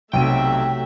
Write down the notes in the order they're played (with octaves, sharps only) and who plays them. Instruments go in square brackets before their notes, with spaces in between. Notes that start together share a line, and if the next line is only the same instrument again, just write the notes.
[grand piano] B1 D#7 [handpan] C3 C4 [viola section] F#3 A3 E5 [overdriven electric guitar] G5